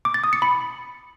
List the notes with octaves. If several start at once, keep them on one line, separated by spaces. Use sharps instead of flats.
D6
A6
D#6
C#7
B5